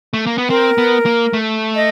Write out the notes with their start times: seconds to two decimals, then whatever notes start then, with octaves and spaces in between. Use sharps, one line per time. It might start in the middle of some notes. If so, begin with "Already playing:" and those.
0.13 A3
0.26 A#3
0.38 B3
0.49 C4 A#4
0.78 B3
1.06 A#3
1.33 A3
1.75 D#5